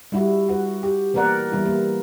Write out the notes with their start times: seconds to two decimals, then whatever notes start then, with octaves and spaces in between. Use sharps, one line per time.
0.12 G3 E4 F#4
0.49 F#4 B4
0.83 G4
1.14 E3 A#3 B3 A#4 D5 F#5
1.52 E3 G3 B3 E4
1.66 A#3